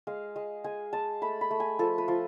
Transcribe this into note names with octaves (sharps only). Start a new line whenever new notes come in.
G#3 F5
G#3
G#3 G#5
G#3 A5
A3 B5
B5
A3
G#5
F3 A4
B4
F3